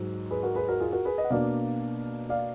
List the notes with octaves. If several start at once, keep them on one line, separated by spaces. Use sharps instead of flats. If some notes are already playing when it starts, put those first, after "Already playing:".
Already playing: G#2 F#3
G#4 B4
F#4 A#4
G#4 B4
F#4 A#4
F4 G#4
F#4 A#4
G#4 B4
B4 D#5
F#5
B2 A#3 D4 D5 F5
D5 F5